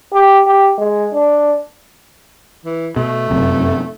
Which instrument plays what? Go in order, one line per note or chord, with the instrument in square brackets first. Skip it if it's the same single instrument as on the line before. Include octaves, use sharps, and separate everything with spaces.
[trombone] G4
G4
G#3
D4
[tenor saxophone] E3
[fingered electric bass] B2 [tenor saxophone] A3
[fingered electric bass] F1 F#2 C3